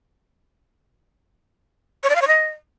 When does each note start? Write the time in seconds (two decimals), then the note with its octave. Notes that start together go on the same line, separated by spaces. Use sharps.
2.03 C#5
2.09 D5
2.16 F5
2.22 C#5
2.28 D#5